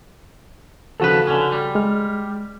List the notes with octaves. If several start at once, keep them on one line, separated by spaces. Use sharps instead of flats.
D#2 C#3 F3 F#4 A4 B4
D3 C#4
G3
G#3 F6